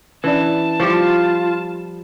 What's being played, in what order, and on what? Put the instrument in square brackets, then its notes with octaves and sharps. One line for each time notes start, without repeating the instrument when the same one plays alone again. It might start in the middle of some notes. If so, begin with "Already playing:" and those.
[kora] E3 [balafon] C#4 D4 D5 [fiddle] A5
[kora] F3 G3 [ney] F4 [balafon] C#6 D6